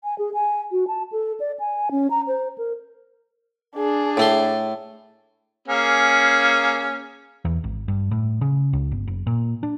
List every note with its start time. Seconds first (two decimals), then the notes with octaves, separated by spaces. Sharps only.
0.04 G#5
0.18 G#4
0.34 G#5
0.72 F#4
0.87 A5
1.12 A4
1.40 D5
1.59 G#5
1.91 C#4
2.10 A#5
2.27 C5
2.58 A#4
3.76 D4 G#4
4.17 A2 A3 C6
5.68 A#3 C#4 G#4
7.45 E2
7.64 G#1
7.88 G2
8.11 A2
8.41 C#3
8.73 C#2
8.92 G1
9.08 F#1
9.27 A#2
9.63 D4